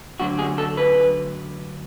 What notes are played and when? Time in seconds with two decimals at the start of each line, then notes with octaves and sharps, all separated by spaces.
0.20 D2 D3 F#3 F#4
0.39 G#4
0.58 A4
0.77 B4